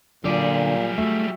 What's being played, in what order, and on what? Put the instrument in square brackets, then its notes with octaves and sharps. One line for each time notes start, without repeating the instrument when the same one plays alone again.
[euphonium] A#2 [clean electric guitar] D3 D5 [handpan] F#3 F4 [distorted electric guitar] G3 G#4
[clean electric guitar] A3 [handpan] F#4 E5